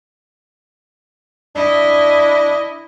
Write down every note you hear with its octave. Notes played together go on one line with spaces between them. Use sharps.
D4 E4 D#5